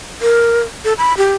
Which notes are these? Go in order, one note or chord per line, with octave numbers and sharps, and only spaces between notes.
A#4
A4
B5
G4